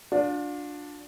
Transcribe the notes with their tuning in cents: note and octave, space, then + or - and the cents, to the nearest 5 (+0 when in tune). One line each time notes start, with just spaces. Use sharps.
D4 +0 F4 +40